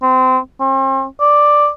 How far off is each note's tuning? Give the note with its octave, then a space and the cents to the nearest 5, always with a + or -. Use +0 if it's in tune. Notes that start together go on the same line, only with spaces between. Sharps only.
C4 -25
C4 +40
D5 +5